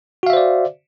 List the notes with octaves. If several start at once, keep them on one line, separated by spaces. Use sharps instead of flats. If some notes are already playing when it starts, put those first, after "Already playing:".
F#4 C5 D5 E5 F5